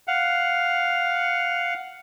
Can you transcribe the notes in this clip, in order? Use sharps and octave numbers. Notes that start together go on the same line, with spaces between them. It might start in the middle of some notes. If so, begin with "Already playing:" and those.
F5 F#5